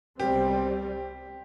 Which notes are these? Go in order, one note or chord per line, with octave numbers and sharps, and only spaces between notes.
C2 B2 G3 C4 G4